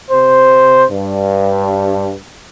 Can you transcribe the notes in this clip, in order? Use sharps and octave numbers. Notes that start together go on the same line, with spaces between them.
C3 C5
G2